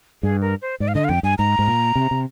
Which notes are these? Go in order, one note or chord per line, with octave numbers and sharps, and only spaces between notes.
G2 G#4
A#4
C5
G#2 D5
F5
D3 D#5
F5
F2 G5
G2 G#5
G#2 A#5
G#2
A#2
C3
C3